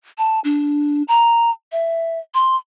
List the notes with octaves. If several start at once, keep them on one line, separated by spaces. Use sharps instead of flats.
A5
D4
A#5
E5
C6